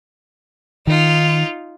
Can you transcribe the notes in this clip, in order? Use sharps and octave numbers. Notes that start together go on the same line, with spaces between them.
D#3 D#4 F4